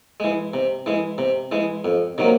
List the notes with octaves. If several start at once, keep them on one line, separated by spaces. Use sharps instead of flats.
E3 G#3
C3
E3 G#3
C3
E3 G#3
F2
C3 D#3 F#3 A#3